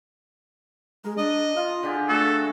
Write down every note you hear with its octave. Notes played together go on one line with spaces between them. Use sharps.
G#3 A#4
D4 D#5
F4 F5
D3 G4 G#4
A3 D4 F#4 A4